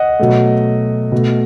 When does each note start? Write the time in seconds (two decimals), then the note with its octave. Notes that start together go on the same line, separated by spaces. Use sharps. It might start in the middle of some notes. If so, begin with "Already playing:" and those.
Already playing: D#5 F#5
0.19 B2 F#3 A3
1.12 B2 A3